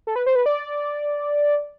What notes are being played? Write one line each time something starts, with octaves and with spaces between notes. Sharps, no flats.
A4
B4
C5
B4
D5